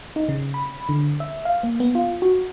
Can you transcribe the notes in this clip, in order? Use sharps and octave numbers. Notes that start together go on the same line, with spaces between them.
D#4
C#3
B5
D3
E5
F5
A#3
B3
F4
F#4